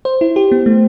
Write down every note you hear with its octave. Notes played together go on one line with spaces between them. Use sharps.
C5
E4
G4
B3
A3